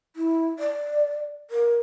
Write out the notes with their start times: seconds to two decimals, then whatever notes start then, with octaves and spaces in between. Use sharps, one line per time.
0.16 E4
0.59 D5
1.50 A#4